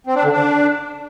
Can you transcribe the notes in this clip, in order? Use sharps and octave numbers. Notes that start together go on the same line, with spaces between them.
C4
D4
D3
D4